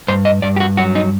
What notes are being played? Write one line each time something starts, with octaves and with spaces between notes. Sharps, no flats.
G2 C5
D#5
G2 D5
G4
F#4
F#3 F#4
D#4